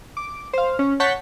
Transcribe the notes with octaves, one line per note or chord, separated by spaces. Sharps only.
D6
C5 F5
C#4
C#5 F#5 A5 C#6 G6 B6